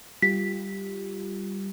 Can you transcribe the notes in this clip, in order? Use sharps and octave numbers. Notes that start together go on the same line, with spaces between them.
G3 F4 G4 B6